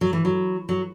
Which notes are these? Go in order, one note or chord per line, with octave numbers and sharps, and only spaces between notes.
F#3
E3
F#3
F#3